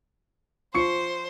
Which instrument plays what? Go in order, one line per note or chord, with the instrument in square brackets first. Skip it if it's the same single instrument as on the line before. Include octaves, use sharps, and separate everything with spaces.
[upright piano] F3 [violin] C5 [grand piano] C#6 C7 C#7